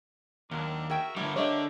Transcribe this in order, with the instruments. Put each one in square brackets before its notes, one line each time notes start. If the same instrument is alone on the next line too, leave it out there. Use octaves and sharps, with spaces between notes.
[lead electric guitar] D#2 [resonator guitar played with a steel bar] F#3 [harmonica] D4 A#4
[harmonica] F#4 A#4 E5 [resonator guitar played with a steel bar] G#4 G5
[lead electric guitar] D3 G3 [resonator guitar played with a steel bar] A3 E4 [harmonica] A#4 F#5 D6
[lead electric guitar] D3 D4 [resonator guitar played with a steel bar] G3 A3 G4 [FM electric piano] C#5 D#5 E5